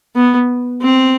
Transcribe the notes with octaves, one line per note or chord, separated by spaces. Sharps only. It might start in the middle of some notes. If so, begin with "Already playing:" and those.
B3
C4